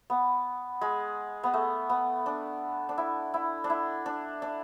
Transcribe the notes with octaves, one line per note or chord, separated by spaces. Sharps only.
B3
G#3
B3
A3
B3
D4
D4
E4
E4
D4
E4
D4
D4